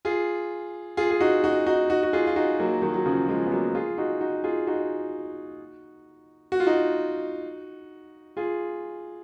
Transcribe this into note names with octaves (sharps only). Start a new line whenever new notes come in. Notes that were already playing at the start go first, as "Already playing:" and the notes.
F4 G#4
F4 G#4
G#4
D#4 F#4
D#4 F#4
D#4 F#4
D#4 F#4
F#4
F4 G#4
F4
D#4 F#4
F#3 A#3
D#3 F#3
F#3
C#3 F3
F3 G#3
B3
F#3 A#3
F4 G#4
D#4 F#4
D#4 F#4
F4 G#4
D#4 F#4
F#4
F4
D#4 F#4
F4 G#4